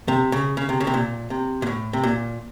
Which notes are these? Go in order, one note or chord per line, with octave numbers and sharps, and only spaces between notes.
C3
C#3
C#3
C3
C#3
C3
A#2
C3
A#2
A2
C3
A#2